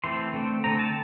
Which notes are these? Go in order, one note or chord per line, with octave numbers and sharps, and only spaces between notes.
E3 A3 C4 C6
D3 A3 C4
D3 A3 C4 A#5
A5